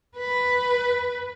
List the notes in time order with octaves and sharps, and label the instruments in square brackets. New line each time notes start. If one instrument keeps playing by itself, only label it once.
[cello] B4